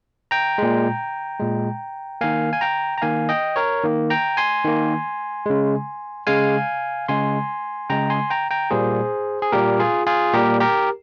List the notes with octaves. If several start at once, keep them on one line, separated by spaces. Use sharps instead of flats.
G5 A#5
A#2 G#3
A#2 G#3
D#3 A#3 F5 G#5
G#5
G5 A#5
A#5
D#3 A#3 F5 G#5
D#5 G5
A#4 C#5
D#3 A#3
G5 A#5
G#5 C6
D#3 A#3
C#3 G#3
C#3 G#3 F5 G#5
C#3 G#3 G#5 C6
C#3 G#3 G5 A#5
G#5 C6
G5 A#5
G5 A#5
A#2 G3 A#3 G#4 C5
G#4
A#2 G3 A#3 G4 A#4
F4 G#4
F4 G#4
A#2 G3 A#3 G4 A#4
G4 A#4